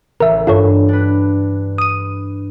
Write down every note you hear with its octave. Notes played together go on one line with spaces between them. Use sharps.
A1 A#4 E5
G2 F4 A4 C#5
D4 B4
D#6 D#7